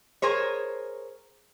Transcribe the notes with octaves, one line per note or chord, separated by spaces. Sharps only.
G#4 A#4 C5 C#5